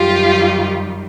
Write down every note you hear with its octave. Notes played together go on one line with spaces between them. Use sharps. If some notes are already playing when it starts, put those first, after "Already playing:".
Already playing: F#2 D#3 G3 F4 G4